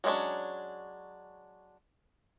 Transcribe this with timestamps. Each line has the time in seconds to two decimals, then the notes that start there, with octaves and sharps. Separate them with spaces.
0.04 F#3 G#3 B3 C#4 D4